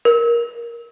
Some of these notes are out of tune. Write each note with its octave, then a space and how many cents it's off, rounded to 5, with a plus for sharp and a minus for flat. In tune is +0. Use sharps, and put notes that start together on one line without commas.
A#4 +10